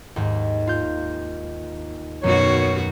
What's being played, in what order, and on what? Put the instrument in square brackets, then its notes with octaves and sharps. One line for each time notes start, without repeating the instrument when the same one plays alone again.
[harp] D#2 G#2
F4 G6
[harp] F#2 F#3 [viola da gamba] B2 D#3 F#4 [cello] C#5